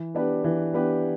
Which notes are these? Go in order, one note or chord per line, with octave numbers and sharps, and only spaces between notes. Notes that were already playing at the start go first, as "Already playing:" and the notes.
Already playing: E3
B3 D4 G4 B4
E3
B3 D4 G4 B4